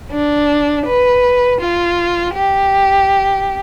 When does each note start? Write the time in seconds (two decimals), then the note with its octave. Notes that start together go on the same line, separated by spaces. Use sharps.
0.11 D4
0.86 B4
1.61 F4
2.34 G4